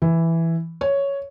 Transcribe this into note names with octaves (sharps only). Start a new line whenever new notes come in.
E3
C#5